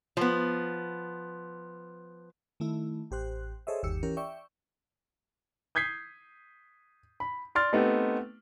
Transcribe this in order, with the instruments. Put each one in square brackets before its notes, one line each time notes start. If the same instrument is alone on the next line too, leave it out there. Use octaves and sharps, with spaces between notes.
[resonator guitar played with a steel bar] F3 B3
[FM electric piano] D#3 A3 E4
A1 G4 C5 F#6
G#4 A4 C5 C#5 D#5 E5
G1 D#2 G4 E6 C#7
E3 C#4 G4 A#4
D5 E5 G5 C#6
[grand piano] D#6 G6 G#6 B6 C7
B5
D5 C6 F6 A6
A3 B3 C4 D#4 G4